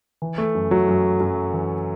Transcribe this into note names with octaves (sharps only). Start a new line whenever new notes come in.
E3
A3
F#2
F#3
F#2
F#2
E3